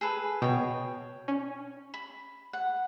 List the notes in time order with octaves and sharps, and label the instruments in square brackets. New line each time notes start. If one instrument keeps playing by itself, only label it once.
[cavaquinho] G#4 A4 B4
[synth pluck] B2 [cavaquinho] C#5 G5
[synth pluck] C#4
[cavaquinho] B5
F#5